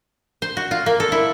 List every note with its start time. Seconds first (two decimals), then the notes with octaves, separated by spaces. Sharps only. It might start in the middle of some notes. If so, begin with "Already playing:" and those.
0.42 C5
0.57 F#4
0.71 F4
0.86 A#3
1.00 A4
1.12 E4